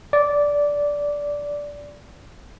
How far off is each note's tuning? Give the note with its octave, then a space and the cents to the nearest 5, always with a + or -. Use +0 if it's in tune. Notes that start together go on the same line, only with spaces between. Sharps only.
D5 -10